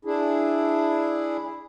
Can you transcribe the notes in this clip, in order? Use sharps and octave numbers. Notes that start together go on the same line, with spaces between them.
D4 E4 G#4